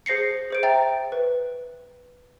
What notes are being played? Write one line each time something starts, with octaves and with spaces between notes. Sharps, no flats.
G#4 C5 A#6 C7 C#7
G#4 C5 D7
E5 G5 A#5 A6
B4